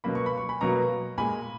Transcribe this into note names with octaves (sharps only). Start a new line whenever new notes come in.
B2 F#3 A#3 B5
C#6
B5
C#6
G#5 B5
B2 F#3 A#3 A#5 C#6
A#2 G#3 G#5 B5